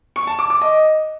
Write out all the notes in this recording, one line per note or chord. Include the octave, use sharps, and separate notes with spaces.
C#6
A5
D6
D6
D#5